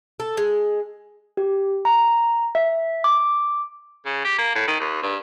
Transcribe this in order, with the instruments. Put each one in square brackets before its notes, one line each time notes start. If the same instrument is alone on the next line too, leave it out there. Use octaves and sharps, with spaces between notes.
[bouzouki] A4
G#3
[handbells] G4
A#5
E5
D6
[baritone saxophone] C#3
G4
A#3
A2
D#3
D#2
G2